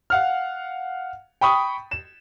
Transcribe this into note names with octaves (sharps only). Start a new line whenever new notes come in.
F5 F#5 F6
G5 B5 C#6 D#6
E7